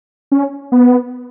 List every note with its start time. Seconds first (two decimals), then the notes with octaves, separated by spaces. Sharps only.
0.32 C#4
0.72 B3